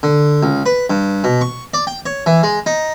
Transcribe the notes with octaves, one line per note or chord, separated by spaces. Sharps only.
D3
C#2
B4
G2
B2
C#6
D5
G5
C#5
E3
G#3
D#4